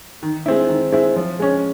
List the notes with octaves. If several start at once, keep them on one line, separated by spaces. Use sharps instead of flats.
D#3
G#3 C4 E4
D#3
G#3 C4 E4
F3
G#3 C#4